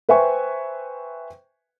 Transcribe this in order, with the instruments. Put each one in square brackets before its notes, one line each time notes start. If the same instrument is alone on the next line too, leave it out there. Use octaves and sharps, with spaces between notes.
[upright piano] B4 C5 E5 G5 G#5 C#6